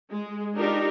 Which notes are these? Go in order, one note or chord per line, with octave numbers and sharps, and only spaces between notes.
G#3
D4 D#4 F4 G4 A#4